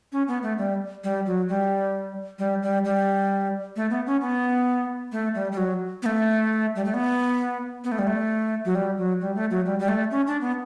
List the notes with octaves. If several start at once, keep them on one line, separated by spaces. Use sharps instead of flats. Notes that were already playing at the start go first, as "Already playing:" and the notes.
C#4
B3
A3
G3
G3
F#3
G3
G3
G3
G3
A3
B3
C#4
B3
A3
G3
G3
F#3
B3
A3
G3
A3
B3
B3
A3
G3
A3
F#3
G3
F#3
G3
A3
F#3
G3
G3
A3
C#4
D4
B3